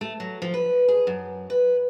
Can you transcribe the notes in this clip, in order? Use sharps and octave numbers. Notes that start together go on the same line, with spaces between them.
A3
F#3
F3
B4
G#4
F#2
B4